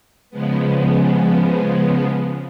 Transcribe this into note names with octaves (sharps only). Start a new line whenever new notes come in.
C#3 F3 G#3 B3